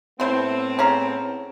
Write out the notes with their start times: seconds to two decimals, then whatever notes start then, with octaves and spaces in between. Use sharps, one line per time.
0.20 A2 B3 C4 E4 C5
0.79 C#4 G#4 A#5